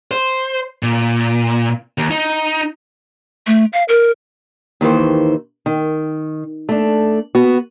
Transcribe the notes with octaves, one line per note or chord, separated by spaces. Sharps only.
C5
A#2
D#2
D#4
A3
F5
A#4
D#2 D#3 E3 C5
D#3
A3 D4
B3 F#4